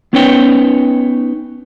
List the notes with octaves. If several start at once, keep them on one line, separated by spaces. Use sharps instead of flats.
B3 C#4 D#4 B4 C#5 G5